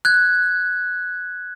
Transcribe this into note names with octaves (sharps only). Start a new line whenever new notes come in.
F#6 G#6